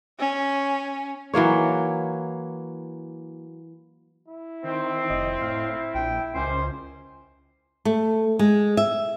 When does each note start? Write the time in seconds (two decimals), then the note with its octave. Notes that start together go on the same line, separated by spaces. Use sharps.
0.20 C#4
1.34 E3 F#3 A#3 C#5
4.28 E4
4.64 D#3 C4
5.10 F1 D#5
5.41 A2 F5
5.95 A#1 G5
6.35 C#2 D#3 G3 C#4 C5
7.85 A3
8.39 G#3
8.77 E5